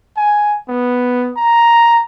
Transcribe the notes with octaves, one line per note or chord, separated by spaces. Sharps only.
G#5
B3
A#5